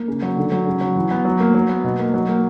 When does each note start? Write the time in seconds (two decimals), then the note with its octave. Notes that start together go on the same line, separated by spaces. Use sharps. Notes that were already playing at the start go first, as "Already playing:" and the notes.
Already playing: A#3
0.08 C#3
0.22 F#3
0.37 D3
0.52 F#3
0.67 C#3
0.81 F#3
0.96 E3
1.11 B3
1.25 F#3
1.40 A#3
1.54 F#3
1.69 B3
1.84 B2
1.99 A#3
2.14 F#3
2.29 A#3